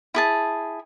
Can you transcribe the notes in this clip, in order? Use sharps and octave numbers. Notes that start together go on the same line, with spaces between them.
E4 G#4 A5